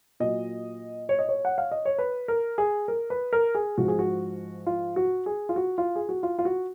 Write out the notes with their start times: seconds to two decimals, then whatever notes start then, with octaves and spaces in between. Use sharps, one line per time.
0.20 A#2 F#3 D#5
1.09 C#5
1.19 D#5
1.29 C#5
1.45 F#5
1.58 F5
1.71 D#5
1.85 C#5
1.98 B4
2.28 A#4
2.58 G#4
2.88 A#4
3.10 B4
3.33 A#4
3.55 G#4
3.78 G#2 F3 F#4
3.88 G#4
3.99 F#4
4.67 F4
4.96 F#4
5.26 G#4
5.49 F4
5.56 F#4
5.78 F4
5.96 G#4
6.09 F#4
6.23 F4
6.39 F4
6.45 F#4